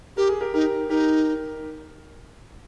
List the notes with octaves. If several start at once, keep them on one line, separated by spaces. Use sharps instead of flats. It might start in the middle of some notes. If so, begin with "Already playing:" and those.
G4 A#4
G#4
G4 A#4
D#4 G4 A#4
D#4 G4 A#4